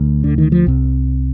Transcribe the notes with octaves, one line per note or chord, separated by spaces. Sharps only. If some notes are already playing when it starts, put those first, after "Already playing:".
Already playing: D2
D3
D#3
F3
C2 C3